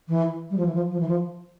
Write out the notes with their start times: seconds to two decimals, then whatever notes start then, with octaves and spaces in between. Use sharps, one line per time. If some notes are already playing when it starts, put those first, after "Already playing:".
0.08 E3
0.50 G3
0.57 F3
0.66 E3
0.74 F3
0.91 F3
1.00 E3
1.08 F3